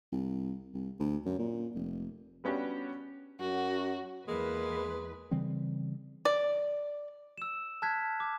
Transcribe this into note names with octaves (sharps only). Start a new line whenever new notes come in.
C2
C2
D2
F#2
A#2
F1
G3 B3 C#4 D4 F#4 G4
F#2 F#4
E2 G#3 A#3 B4
C#3 E3 G3 C4
D5
E6 E7
A5 F6 F#6 G#6 B6
D6